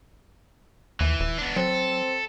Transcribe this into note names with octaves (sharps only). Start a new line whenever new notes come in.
D#2 E3
D#1
B3 D4
F#3 C4 A4